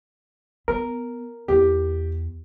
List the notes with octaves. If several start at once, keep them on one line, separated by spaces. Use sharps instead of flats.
B3 A#4
E2 G4